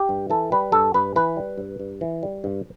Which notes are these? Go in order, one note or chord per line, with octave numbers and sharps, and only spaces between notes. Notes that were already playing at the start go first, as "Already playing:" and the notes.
Already playing: G4
G2
E3 A4
G3 B4
G2 A4
G2 B4
E3 B4
G3
G2
G2
E3
G3
G2